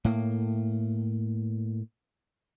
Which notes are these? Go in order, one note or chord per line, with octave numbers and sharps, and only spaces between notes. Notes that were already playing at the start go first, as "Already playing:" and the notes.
A2 A#3